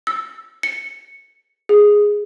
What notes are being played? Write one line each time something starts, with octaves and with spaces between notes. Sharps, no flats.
E6
C#7
G#4